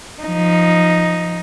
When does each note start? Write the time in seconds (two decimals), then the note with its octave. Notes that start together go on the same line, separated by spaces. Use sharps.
0.23 F3 D#4